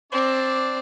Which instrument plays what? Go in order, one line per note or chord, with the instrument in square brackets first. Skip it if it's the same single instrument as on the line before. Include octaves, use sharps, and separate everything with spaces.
[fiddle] C4 [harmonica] D4 D5